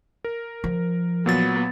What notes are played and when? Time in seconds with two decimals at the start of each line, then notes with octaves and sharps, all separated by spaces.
0.24 A#4
0.64 F3
1.26 A#2 F#3 B3 A6